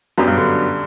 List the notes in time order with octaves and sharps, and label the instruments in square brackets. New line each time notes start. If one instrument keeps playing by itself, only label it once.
[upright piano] F#2 [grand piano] F#3 B3 D4 G4
[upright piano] G2
D3